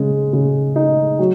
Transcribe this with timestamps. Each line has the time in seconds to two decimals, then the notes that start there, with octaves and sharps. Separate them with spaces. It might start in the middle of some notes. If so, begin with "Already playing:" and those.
Already playing: C#3 G#3
0.33 C#3
0.76 D#4
1.19 F#3